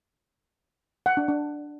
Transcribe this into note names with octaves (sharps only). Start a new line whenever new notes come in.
F#5
D4
D4